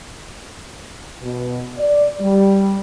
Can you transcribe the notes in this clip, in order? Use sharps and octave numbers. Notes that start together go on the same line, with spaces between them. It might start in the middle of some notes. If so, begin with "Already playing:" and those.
B2
D5
G3